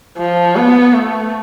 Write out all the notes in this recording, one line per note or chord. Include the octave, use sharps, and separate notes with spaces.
F3
B3
A3